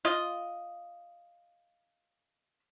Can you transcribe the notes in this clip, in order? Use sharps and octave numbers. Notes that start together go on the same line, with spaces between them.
F4 D#5